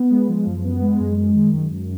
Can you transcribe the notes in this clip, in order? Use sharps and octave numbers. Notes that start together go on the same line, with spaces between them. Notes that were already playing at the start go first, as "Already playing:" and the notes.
Already playing: B3
G#3
F3
F#2
B3
G#3
F#2
G#3
D#3
F#2
F#2